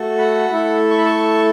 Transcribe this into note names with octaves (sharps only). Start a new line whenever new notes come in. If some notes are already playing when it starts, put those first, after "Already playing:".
Already playing: A3 F#4 A4
F#5 B5
A3 E4 A4
C#6
B5
A5 C#6